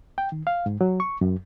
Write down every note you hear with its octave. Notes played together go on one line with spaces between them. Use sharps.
G5
D#3
F5
G#2
F#3
C#6
F#2